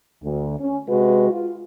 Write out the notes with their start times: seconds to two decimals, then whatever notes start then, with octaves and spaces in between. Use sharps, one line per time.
0.23 D2
0.59 C#4
0.88 C3 G#3 F#4 B4
1.30 F4